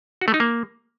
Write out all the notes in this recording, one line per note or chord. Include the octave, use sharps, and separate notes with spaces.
F#4
A3
D#4
A#3